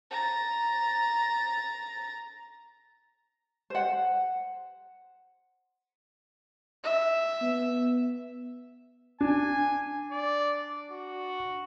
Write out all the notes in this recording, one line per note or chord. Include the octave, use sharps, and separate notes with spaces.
A#5 A6
C5 F#5
E5
B3
D4 G#5
D5
F#4